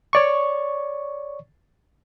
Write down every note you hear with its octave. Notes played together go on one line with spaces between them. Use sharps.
C#5 D5 C#6